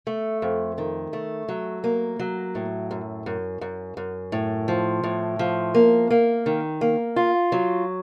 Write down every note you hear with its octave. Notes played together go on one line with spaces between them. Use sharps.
A3
F2
D#3
A3
F#3
A#3
F#3
A2
F#2
F#2
F#2
F#2
A2
F3
A2
F3
A#3
A#3
D#3
A#3
F4
F#3